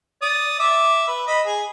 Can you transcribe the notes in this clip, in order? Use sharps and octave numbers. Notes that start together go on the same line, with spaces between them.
D5 D#6
E5 D6
B4
D#5 B5
G#4